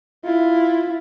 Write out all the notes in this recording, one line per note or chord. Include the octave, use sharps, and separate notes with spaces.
E4 F4